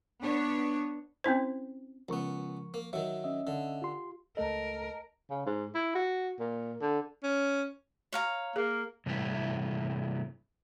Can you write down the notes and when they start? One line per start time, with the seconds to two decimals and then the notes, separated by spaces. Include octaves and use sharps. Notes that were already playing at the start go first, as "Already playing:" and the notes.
0.22 B3 D4 C#5
1.24 C4 C#4 E4 C5
2.09 C#2 F3 B3 A#4 C#6
2.74 A#3
2.93 D#3 F#3 F#4 E5
3.24 C#4 D#5 E5
3.47 D3
3.82 F4 G4 C6
4.37 C#2 A3 A4 A#4 D#5 A5
5.30 C#3
5.46 G#2
5.75 E4
5.95 F#4
6.40 A#2
6.81 D3
7.23 C#4
8.13 C#5 F5 A#5
8.56 A#3 G#4
9.06 G2 C3 G3 A3 E4